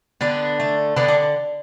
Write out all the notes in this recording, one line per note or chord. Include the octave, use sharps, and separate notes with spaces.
D3 B3 D4
A3
D3 B3 D4
D4